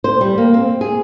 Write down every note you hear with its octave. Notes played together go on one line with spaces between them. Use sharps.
C5
G3
A#3
C4
G#4